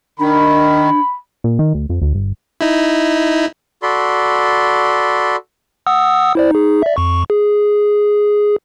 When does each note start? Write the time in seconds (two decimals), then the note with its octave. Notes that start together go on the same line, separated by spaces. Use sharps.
0.19 D#3 D4 B5
1.44 A#2
1.59 D#3
1.74 D2
1.89 F2
2.02 D2
2.14 G1
2.61 D#4 E4
3.82 F#4 A4 D5 B5 C6
5.87 F#5 D#6 E6
6.35 E4 C5 D5
6.51 D#4 G#4
6.82 D5 E5
6.97 F2 C#6
7.30 G#4